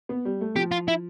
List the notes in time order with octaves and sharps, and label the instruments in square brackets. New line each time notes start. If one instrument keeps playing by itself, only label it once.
[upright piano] B3
G3
A3
[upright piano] F3 [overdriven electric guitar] G4
[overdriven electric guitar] F4
E4